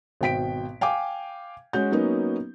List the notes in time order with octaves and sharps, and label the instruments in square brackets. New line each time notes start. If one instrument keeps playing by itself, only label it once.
[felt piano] G#1 B2 G5 B6 D7
F5 G5 G#5 D6
G#3 C#4 F#4 G6
F#3 A#3 B3 C#4 D#4